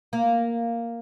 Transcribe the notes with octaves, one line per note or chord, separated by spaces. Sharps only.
A#3